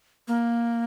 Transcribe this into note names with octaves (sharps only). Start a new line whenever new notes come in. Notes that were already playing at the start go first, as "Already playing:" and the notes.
A#3